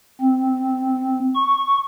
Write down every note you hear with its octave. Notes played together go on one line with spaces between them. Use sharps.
C4
C#6